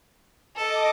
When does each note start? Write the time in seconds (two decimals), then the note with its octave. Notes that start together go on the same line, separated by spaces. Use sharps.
0.56 A4 D#5 D6